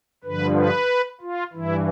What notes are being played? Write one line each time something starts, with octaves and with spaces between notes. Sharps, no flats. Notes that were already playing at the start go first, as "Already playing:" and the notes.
G2 D3 F3 B4
B4
F4
G2 E3 E4